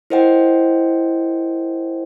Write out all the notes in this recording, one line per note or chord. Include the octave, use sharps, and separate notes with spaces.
E4 A#4 C5 D#5 F#5 G5